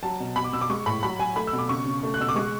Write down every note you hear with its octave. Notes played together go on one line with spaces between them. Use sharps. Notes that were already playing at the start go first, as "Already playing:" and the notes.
F#3 A5
B2
B2 B5
D6
B2 E6
D6
G#3 C#6
A2 B5
F#3 B5
F#3 G#5
A3 B5
E6
B2
D6
C#3 C#6
C#3
A3
F#6
B2 E6
D6
G#3 C#6